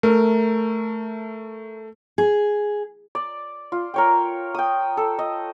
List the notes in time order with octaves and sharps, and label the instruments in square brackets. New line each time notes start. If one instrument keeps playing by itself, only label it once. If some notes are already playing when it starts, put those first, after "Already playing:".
[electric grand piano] A3 [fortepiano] A#4
[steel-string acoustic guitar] G#4
[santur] D5
F4
A#4 C#5 G5
G5 D#6
A4
D#5